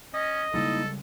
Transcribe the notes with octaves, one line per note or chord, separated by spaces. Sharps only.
C#4 D#5
C#3 G3 G#3 A#3 D#4 E4 A4